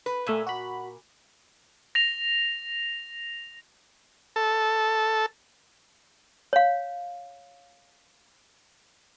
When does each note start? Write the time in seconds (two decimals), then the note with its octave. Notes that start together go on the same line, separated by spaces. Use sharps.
0.06 B4
0.26 A#2 A3 E5 G#5
0.47 F#4 B5
1.95 A#6 F7
4.36 A4
6.53 C#5 F5